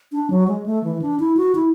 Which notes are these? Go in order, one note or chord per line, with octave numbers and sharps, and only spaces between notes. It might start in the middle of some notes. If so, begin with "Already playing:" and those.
D4
F#3
G#3
A3
E3
D4
E4
F#4
E4